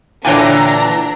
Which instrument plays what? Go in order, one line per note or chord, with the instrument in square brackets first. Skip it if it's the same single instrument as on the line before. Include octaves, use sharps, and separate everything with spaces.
[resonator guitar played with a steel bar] A#2 D3 E3 [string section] D4 A#5 [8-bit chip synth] C#5 G5 G#5